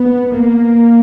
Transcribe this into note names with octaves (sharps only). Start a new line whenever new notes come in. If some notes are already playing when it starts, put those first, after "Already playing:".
Already playing: B3
A#3